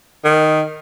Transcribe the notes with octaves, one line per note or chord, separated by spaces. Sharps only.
D#3